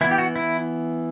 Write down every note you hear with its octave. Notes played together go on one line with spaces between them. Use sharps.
E3 B3 E4
G4
F#4
E4